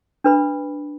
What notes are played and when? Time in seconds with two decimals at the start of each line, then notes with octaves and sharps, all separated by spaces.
0.24 D4 B4 B5